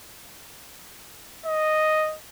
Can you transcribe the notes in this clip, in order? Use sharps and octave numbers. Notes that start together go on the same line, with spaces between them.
D#5